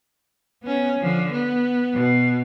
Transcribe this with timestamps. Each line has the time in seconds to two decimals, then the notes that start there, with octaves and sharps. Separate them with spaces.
0.63 B3 C#4
0.99 D3 F3
1.32 B3
1.94 B2